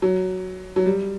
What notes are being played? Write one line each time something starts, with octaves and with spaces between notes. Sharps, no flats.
F#3
F#3
G3